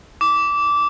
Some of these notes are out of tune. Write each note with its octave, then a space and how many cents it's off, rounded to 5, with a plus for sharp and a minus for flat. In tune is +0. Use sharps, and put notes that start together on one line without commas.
D6 -15